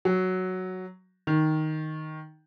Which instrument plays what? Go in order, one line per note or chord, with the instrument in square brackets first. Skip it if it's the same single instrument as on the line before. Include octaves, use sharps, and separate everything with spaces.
[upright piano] F#3
D#3